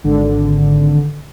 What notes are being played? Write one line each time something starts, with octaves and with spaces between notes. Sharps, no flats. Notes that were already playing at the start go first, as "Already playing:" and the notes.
G#1 D3